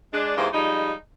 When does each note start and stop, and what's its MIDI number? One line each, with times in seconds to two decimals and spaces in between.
0.12 0.32 56
0.12 0.32 62
0.37 0.47 40
0.37 0.47 44
0.37 0.47 52
0.37 0.47 58
0.37 0.47 67
0.37 0.47 72
0.53 0.92 53
0.53 0.92 55
0.53 0.92 56
0.53 0.92 63